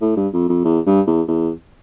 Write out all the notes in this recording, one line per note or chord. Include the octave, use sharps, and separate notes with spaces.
A2
G2
F2
F2
E2
G2
E2
E2